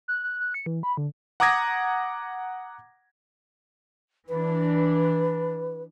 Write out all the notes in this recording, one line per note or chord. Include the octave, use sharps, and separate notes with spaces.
F#6
F#6
F#6
C#7
E3
B5
D3
F#5 A#5 D6 D#6 G#6 A#6
E3 D4 B4